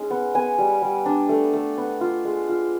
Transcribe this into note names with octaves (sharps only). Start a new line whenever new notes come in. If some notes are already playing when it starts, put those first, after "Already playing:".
Already playing: G#3 C#4 D#4
B3
B3 G#5
G3
G3
D4
A3
A3
B3
F4
G#3
F4